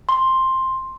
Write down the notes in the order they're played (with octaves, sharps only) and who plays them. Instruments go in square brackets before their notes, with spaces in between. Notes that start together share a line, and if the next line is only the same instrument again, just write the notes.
[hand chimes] C6